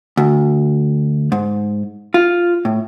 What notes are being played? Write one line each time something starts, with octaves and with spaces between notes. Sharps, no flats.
D2
G#2
F4
A2